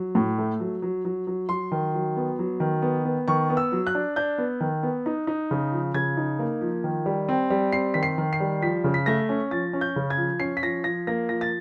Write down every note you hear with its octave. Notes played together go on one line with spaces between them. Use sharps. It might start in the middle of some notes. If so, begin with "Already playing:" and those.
Already playing: F#3
A2
A3
F#3
F#3
F#3
F#3
F#3 C6
D#3
F#3
B3
F#3
D#3
B3
B3
D#3 C#6
B3
E6
F#3
F#6
D4
D4 G6
B3
D#3
B3
D#4
D#4
C#3
F3
C#3 G#6
D#4
A#3
F3
D#3
G3
C4
G3
C4 C7
D#3 B6
C7
D#3
C7
G3
F3 B6
C#3
B6
A3 A#6
C#4
F3 A6
C#4
G6
C#3
G#6
F3
C#4 C7
B6
F3 A#6
F3 A#6
A#3 A#6
F3 A#6
A6